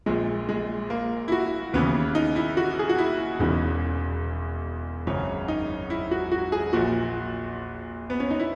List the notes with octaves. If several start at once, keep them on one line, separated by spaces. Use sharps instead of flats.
A#1 A#2 G#3
G#3
A#3
E4
F#4
D#2 C#3 E3 B3
D#4
E4
F#4
G#4
F#4
E4
E1 E2 C#3 E3 D#4
G#1 F#2 C#3 C#4
D#4
E4
F#4
F#4
G#4
A#1 A#2 F#4
B3
C#4
D#4
E4